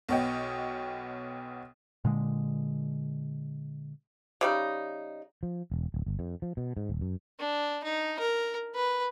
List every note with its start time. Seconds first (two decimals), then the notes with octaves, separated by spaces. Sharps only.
0.09 B1 B2 B3 C#5 D#5 G5
2.05 A#2 D3 G#3
4.41 C#3 G3 D#4
5.43 F3
5.72 E1
5.94 D1
6.06 G1
6.19 F2
6.42 F3
6.57 B2
6.77 G#2
6.89 D#1
7.01 F#2
7.39 D4
7.84 D#4
8.19 A#4
8.75 B4